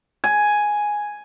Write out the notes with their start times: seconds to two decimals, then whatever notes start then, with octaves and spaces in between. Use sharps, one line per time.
0.24 G#5